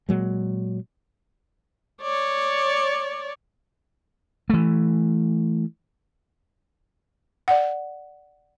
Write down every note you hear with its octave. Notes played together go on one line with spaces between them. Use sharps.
A#2 F#3 G#3
C#5 D5
E3 A3
D5 F#5